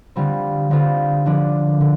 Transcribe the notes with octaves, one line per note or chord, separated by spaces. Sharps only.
D3 G3 C4 F4
D3 G3 C4 F4
D3 F3 D4
D3